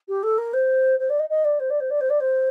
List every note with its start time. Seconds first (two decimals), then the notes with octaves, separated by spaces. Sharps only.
0.08 G4
0.23 A4
0.38 A#4
0.53 C5
0.99 C5
1.09 D5
1.19 D#5
1.29 D#5
1.44 D5
1.59 C5
1.70 D5
1.80 C5
1.90 D5
2.00 C5
2.09 D5
2.20 C5